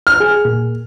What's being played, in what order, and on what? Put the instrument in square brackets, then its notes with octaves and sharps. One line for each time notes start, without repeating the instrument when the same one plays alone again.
[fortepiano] F6
[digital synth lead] G#4
A#2